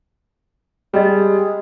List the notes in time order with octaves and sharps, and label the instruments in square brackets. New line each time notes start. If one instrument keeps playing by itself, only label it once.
[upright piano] G3 [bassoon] G#3 [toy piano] G#4 D#5